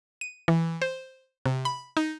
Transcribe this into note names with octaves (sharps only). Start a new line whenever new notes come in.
D#7
E3
C5
C3
B5
D#4